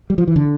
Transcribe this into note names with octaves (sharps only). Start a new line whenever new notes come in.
G3
F3
E3
D3